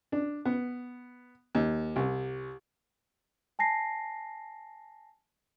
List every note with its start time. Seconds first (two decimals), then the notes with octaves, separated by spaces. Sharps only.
0.12 D4
0.45 B3
1.55 D#2
1.96 C2
3.59 G#5 A5 A#6 C7